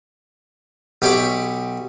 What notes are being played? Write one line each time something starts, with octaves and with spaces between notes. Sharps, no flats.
B1 G4 C#5 D5 E5 D6